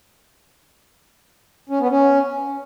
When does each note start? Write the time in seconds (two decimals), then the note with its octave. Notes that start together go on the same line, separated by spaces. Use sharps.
1.69 C#4
1.80 B3
1.91 C#4